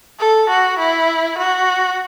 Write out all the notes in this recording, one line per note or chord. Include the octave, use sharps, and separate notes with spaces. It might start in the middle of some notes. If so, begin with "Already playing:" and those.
A4
F#4
E4
F#4